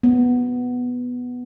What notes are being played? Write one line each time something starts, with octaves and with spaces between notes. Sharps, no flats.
B3